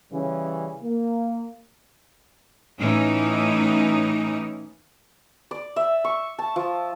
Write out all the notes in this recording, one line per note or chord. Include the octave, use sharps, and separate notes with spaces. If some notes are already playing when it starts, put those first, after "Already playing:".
C#3 E3 G3 C#4
A#3
A2 E3 C#4 D#4
D5
E5
C#6
A5
F3